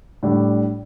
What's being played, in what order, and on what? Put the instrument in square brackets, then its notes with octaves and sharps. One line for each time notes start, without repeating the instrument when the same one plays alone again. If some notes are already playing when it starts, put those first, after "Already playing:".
[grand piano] A2 G3 D4